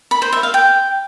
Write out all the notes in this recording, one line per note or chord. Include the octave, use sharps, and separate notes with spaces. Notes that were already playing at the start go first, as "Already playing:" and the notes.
B5
C5
E5
F5
G5